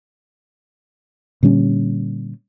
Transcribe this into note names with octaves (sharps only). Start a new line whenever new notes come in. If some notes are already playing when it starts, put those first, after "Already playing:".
A#2 D3 G3 C#4